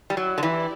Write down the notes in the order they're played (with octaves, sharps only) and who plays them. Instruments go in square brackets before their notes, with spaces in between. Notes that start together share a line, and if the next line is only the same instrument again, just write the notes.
[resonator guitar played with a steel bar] G3
[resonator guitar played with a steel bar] F#3 [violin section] E4 G4 D5
[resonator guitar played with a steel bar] D3
E3